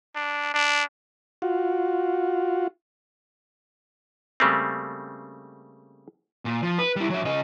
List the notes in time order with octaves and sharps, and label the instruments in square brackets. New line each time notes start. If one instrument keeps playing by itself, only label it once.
[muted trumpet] D4
D4
[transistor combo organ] F4 F#4
[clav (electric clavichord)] C#3 G3 A3 A#3 C4
[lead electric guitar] A#2
F3
B4
G3 E4
F#3 E5
C#3 D#5